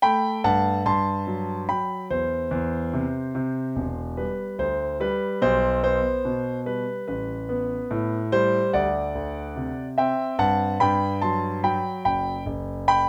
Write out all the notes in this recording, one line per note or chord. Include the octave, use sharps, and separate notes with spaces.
A3 G5 B5
G2 F#5 A5
G2 A5 C6
F#3
F#3 G5 B5
E2 C5
E2
C3
C3
E1
G3 B4
D2 C5
G3 B4
B1 C5
B3 C5
B2
G3 B4
A1 B4
B3
A2
G3 C5
D2 D5 F#5
D2
C3
C4 E5 G5
G2 F#5 A5
G2 G5 B5
F#3 A5 C6
F#3 G5 B5
F#1 G5 B5
F#1
G5 B5